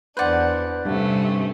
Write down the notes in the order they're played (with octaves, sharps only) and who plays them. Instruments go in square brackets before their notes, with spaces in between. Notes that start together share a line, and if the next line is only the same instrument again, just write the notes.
[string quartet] E2 D4 [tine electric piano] B4 D5 [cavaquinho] C5 F#5
[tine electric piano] G2 [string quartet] C3 A3 C#4